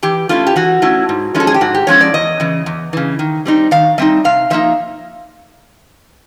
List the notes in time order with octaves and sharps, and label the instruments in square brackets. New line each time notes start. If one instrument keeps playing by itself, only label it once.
[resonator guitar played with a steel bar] E3 G4
A3 C#4 E4 F4
G4
E3 F#4
A3 C#4 E4
G#2
F3 G#3 C#4 E4
A4
G#4
G4
G#2 F#4
G4
F3 G#3 C#4 E4 C#5
D5
E2 D#5
C#3 E3
E2
C#3 E3
D#3
G3 C4 D#4
D#3 F5
G3 C4 D#4 E5
C3 F5
F3 A#3 D#4 E5